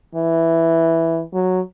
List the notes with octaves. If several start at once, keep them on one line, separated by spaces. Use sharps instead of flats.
E3
F#3